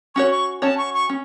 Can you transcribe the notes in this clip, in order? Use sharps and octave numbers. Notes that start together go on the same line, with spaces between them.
C#4 F#4 C#5 C#6
C#6
C#4 F#4 C#5 A5
C#6
C#6
C#4